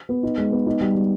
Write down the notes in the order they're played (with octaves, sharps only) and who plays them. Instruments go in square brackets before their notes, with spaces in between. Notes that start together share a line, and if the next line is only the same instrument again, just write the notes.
[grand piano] B3
D#4
G#3
B3
D#4
G3
G3